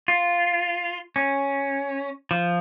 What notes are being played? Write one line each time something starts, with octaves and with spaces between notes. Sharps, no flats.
F4
C#4
F3